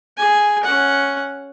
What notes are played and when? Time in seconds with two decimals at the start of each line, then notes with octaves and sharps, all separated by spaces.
0.17 G#4 G#5
0.63 C#4 F#5